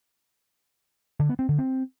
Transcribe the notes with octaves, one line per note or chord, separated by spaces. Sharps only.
D3
B3
C4
D3
C4